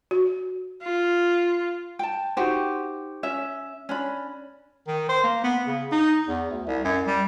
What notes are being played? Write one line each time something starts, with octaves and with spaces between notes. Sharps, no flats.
F#4
F4
G5 A5
D#4 F#4 G4 C5
C#4 E5
C#4 D4 B5
D#3
C5
A#3
B3
C#3
D#4
E2
D2
C2
F#2
G3